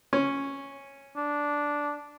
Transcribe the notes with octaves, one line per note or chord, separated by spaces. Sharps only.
C#4
D4